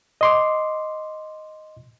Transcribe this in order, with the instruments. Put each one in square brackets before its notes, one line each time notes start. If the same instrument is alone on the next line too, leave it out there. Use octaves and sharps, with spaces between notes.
[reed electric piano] D#5 C6 D6